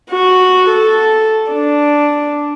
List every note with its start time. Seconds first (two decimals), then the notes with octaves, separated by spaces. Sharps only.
0.11 F#4
0.69 A4
1.51 D4